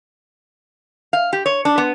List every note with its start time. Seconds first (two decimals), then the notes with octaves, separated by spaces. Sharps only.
1.13 F5
1.33 G4
1.46 C#5
1.65 D4
1.78 B3